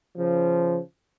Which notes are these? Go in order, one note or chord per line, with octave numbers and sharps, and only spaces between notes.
C#3 F3